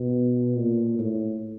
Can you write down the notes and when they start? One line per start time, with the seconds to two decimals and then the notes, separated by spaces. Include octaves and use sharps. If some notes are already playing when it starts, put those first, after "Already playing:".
Already playing: B2
0.56 A#2
0.99 A2